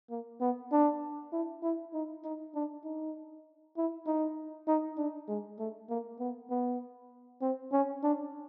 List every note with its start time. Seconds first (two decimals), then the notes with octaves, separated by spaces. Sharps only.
0.10 A#3
0.40 B3
0.72 D4
1.32 E4
1.63 E4
1.94 D#4
2.24 D#4
2.55 D4
2.84 D#4
3.77 E4
4.06 D#4
4.67 D#4
4.98 D4
5.28 G#3
5.59 A3
5.90 A#3
6.20 B3
6.50 B3
7.41 C4
7.72 C#4
8.03 D4